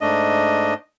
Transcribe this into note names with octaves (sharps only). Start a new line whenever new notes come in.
G#2 A3 D4 D#5